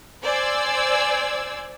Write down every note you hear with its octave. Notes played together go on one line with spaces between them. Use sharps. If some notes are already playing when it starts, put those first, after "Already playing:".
C5 D5 G#5 E6 G#6